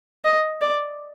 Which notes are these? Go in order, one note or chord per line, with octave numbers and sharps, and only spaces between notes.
D#5
D5